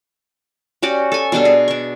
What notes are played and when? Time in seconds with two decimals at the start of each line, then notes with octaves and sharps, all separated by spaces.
0.82 C#4 F#4 G4 D5
1.12 A4 G#5
1.32 B2 G3 D4 A4
1.45 G#4
1.68 D4 C#6